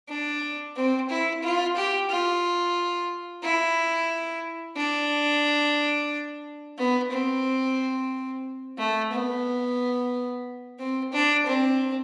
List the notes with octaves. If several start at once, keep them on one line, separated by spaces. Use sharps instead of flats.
D4
C4
E4
F4
G4
F4
E4
D4
B3
C4
A3
B3
C4
D4
C4